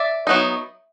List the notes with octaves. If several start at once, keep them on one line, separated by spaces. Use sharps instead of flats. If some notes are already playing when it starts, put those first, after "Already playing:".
Already playing: D5 E5
F#3 B3 D#4